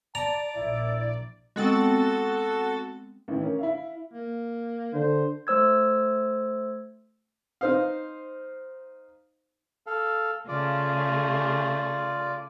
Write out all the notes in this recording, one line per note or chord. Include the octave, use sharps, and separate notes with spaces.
D5 A5 A#5
A#1 E4
G#3 B3 C4 F#4 A4 A6
A1 D#3 E3
C#4 A#4
E4 E5 F5
A#3
D3 C5
A3 C5 E6 G#6
D#4 C5 F5
A4 F5
C#3 A3 F4 G#4 D5